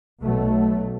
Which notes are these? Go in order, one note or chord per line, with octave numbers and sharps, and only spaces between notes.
B1 B2 F#3 A3